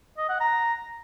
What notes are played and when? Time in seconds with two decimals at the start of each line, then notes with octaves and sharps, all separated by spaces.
0.18 D#5
0.29 F#5
0.41 A#5